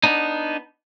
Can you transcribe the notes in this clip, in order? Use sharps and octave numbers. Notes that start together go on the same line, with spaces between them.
B3 D4 D#4